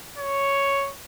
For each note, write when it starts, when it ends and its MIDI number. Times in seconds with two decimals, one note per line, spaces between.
0.19 0.92 73